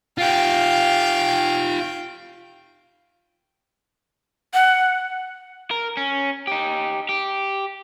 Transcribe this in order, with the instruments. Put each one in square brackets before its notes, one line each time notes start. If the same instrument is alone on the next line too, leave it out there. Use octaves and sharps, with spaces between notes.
[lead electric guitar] F4 G4 [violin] F5 G5
[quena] F#5
[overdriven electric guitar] A#4
C#4
D#4 G4
G4